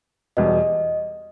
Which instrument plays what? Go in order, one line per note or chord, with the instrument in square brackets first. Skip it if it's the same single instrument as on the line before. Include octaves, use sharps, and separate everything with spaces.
[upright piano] E2 B2 G3 [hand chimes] D#5